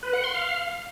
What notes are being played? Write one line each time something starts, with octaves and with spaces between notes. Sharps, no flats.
B4
F#5
C6
F5